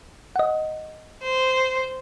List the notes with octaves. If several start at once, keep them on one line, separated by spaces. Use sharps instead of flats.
D#5 F#5
C5